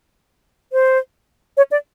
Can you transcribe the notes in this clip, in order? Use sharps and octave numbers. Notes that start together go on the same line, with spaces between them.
C5
C#5
D5